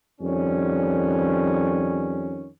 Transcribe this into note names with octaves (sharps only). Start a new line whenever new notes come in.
F2 D#3 G3 C#4